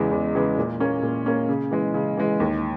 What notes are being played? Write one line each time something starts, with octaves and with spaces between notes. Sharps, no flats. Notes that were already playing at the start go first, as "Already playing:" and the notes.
Already playing: E2 C#3 E3 G#3
E2
C#3 E3 G#3
A#2
A#3 C#4
A#2
A#3 C#4
C#3
E3 G#3
C#3
E3 G#3
D#2